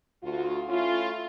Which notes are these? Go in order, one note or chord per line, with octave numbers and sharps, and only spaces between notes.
D2 F4 F#4
A3 C#4 E4 F4